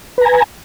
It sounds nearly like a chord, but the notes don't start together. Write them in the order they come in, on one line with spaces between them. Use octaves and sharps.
B4 A#5 G#5